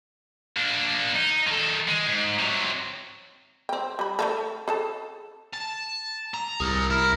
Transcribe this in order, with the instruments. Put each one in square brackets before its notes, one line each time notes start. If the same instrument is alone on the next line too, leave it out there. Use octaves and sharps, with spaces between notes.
[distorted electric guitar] A#3 D4
D#4
D#3 A4
G#3
G#2
C3 F#3
[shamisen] C4 G5
G3 B5
A3 A#3 A4
G#4 A4 A5
[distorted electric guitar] A5
A#5
[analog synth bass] C2 [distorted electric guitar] G#4 A#4
[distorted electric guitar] E4 [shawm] A#4